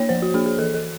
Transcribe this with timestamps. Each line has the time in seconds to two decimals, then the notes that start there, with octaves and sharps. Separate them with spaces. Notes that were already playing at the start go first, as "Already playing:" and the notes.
Already playing: A#3 D4 C#5
0.09 F3 C5
0.22 F#4
0.34 A#3 D4 G#4
0.46 G#4
0.59 E3 A4
0.74 A4